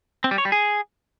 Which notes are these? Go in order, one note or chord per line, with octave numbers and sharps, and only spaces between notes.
C4
G3
C#5
G3
G#4